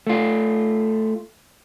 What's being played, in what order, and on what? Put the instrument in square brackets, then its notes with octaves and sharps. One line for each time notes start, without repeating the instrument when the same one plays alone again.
[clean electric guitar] A3 F4